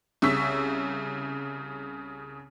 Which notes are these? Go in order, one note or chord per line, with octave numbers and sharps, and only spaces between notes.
C2 C#3 C#6 E6 B6